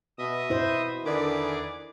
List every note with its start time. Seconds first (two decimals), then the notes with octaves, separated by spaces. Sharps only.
0.18 B2 D#5 E5 D#6
0.50 B2 E4 C5
1.05 E2 D3 D#3 G#4 B4 D5 D6